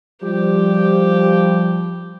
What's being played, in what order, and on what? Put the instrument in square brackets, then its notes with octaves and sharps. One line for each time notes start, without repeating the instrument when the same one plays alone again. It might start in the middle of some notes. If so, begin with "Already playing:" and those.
[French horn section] F3 G3 [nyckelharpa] G4